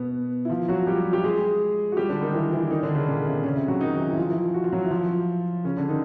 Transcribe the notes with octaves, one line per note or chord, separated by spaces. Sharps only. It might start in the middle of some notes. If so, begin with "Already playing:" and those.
Already playing: B2 B3
E4
F3 F4
F#3 F#4
G3 G4
G4
G#3 G#4
F#4
G3 G4
D3 D4
D#3 D#4
E3 E4
E3 E4
D#3 D#4
D3 D4
C#3 C#4
A#2 A#3
C3 C4
C#3 C#4
C3 C4
F#3 F#4
D#3 D#4
E3 E4
E4
F3 F4
E3 E4
F#4
F4
F#3 F#4
E4
F3 F4
C#3 C#4
D3 D4
D#3 D#4